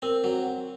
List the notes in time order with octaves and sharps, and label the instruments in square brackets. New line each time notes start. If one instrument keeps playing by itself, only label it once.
[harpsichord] C4 [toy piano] A#4
[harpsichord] F#3